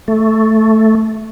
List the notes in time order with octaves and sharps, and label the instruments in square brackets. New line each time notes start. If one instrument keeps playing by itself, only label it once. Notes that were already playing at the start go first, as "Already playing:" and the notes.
[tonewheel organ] A3